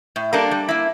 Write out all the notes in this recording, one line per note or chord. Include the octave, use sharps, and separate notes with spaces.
A2
G3 A#3 D4 A4
G3
A#3 E4